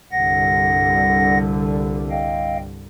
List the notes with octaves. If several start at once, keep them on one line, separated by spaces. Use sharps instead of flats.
C2 G2 D3 F#5 A#6
D#5 F5 G5